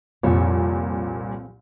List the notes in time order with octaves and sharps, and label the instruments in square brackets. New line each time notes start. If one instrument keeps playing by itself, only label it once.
[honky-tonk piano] C2 A#2 [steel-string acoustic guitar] F2 C#5 A5